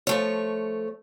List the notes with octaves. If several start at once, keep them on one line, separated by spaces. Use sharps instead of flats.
F3 A3 C#5